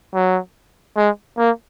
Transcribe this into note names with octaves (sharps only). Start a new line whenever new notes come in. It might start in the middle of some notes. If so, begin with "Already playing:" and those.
F#3
G#3
A#3